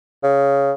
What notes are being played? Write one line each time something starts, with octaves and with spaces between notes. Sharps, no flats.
C#3